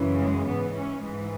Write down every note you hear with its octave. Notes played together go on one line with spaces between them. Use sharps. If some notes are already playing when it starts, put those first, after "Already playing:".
Already playing: F#2 C#3 E3
G#3
G#2 E3 B3
C#4
G#2 E3 G#3